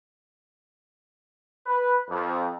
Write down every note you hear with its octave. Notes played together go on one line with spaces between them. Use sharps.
B4
F2